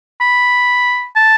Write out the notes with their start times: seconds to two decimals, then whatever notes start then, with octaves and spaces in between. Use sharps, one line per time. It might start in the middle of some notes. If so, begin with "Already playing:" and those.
0.21 B5
1.16 A5